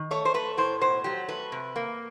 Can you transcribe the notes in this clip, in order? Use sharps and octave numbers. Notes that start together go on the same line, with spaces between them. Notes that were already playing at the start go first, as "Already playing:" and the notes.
Already playing: D#3
A3 C#5
C5
A3 B4
A2 C5
B2 C5
F#3 G4
A3 B4
C3
A#3